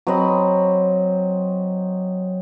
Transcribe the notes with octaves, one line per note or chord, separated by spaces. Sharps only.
F#3 C4 D#5 B5